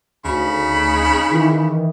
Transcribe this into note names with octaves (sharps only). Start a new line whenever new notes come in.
D2 C#3 D#4 B5
D#3 E3